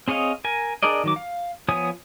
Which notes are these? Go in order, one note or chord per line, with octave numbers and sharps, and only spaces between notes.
C4 G#4 C#5 D#5 F5
A#4 G#5
D4 G#4 A#4 D5 D#5
D#3 F#3 D6
F5
F3 B3 C#5 G#5 D#6